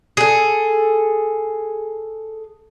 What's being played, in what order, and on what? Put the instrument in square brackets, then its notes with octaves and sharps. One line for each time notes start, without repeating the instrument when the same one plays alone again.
[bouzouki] G#4 A4